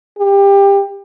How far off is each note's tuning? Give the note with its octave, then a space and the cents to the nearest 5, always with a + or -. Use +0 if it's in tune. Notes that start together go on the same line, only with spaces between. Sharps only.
G4 +20